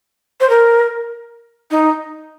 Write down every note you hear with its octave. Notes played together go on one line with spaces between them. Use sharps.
C5
A#4
D#4